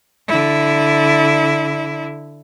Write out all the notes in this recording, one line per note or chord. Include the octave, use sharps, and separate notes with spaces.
D3 E4